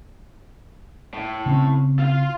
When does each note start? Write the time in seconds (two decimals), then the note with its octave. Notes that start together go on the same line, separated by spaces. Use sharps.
1.14 A2
1.46 C#3 C4 C#4
1.99 F4 F5